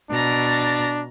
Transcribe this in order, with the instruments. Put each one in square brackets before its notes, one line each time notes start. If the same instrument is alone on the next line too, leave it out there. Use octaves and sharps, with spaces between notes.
[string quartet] B2 A#5 A6 [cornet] D4